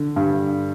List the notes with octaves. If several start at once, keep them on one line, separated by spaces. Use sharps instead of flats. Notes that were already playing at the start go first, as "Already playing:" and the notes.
Already playing: D3
G2